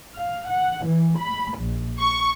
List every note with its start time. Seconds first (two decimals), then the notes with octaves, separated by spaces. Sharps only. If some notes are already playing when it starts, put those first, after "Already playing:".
0.18 F5
0.51 F#5
0.87 E3
1.18 B5
1.60 A#1
2.00 C#6